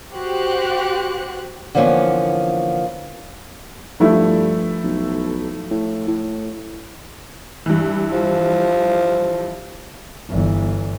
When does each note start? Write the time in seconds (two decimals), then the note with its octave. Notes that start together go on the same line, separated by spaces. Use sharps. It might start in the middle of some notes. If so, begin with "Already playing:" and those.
0.14 F#4 G4 C5 F#6
1.75 D3 E3 F3 A#3 B3 C#4
4.00 G2 F3 A3 E4
4.84 B1
5.71 A2
6.08 A2
7.66 G2 E3
8.13 F3
10.29 G1 E3